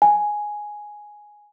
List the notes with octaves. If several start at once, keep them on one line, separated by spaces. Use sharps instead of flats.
G#5